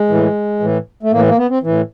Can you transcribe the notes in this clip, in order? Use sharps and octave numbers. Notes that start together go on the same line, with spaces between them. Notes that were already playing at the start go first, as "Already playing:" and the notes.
Already playing: G#3
A2 E3
A2 E3
A3
A2 E3 A#3
A#3
B3
C4
A2 E3